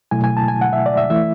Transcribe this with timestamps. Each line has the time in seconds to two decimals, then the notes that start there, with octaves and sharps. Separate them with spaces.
0.11 B2 F#3 A3 E4 G#5
0.24 G#5
0.37 A5
0.48 G#5
0.61 F#5
0.73 E5
0.86 D5
0.97 E5
1.10 E3 A3 E4 E5